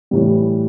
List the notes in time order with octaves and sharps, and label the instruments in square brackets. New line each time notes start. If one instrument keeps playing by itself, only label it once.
[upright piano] A2 E3 G3